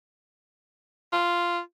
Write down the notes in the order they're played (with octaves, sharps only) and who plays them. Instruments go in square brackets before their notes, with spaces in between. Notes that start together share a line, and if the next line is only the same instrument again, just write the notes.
[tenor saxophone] F4